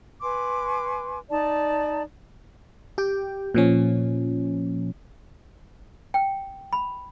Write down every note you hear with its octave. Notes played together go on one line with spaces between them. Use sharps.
B4 G#5 C6 D6
D#4 D5 A5
G4 G5
A#2 F3 C#4
G5
B5